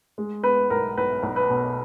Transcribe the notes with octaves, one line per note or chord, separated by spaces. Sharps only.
G#3
B3 B4
B1 A#4
B1 B4
B1
B4
B2